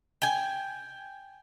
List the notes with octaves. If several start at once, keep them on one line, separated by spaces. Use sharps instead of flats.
G5 G#5